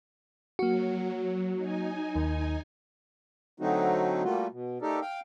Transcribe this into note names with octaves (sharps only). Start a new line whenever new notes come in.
F#3 A#3 F#4
D#4 G#5
D#2
D3 F#3 A3 C4 D#4 F#4
G3 A3 A#3 F4 F#4
B2
A3 D#4 G4 A4 A#4 D5
F5 G5